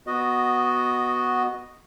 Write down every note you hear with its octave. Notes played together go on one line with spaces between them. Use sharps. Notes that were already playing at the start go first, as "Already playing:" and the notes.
B3 F#4 D#5